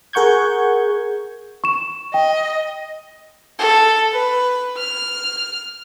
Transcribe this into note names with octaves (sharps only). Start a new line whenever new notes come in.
G#4 A#4 F#5 C#6 G6 G#6
C#6 E7
D#5 G5
A4
B4
F6